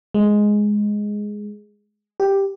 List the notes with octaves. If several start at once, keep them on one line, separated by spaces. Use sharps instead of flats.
G#3
G4